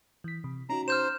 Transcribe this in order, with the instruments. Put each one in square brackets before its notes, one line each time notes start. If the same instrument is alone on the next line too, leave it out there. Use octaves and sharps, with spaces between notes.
[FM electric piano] E3 B6
C3
[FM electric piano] C#4 D#4 F#4 [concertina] A#5
[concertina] C5 [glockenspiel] F6 G6 E7